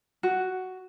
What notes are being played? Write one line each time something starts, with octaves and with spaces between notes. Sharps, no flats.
F#4